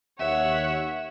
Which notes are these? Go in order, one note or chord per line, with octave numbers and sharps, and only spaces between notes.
D#2 C#5 E5 F#5